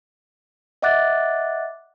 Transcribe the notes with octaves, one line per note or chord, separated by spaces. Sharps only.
D#5 E5 F#5 D6 F#6 A6